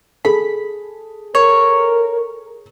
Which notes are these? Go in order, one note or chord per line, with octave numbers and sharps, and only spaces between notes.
G#4 A4 B5
A#4 C#5